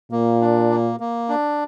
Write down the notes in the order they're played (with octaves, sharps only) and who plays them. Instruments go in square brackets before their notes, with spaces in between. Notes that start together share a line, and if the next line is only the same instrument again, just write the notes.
[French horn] A#2 [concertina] A#3
[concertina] D4
A#3
A#3
D4